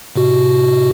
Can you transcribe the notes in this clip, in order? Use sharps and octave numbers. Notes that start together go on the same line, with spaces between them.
A2 C3 F#4